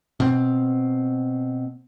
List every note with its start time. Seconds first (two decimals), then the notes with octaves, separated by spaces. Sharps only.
0.20 B2 C4